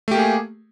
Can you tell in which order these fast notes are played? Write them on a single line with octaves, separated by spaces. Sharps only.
A3 G4 A#3 G#4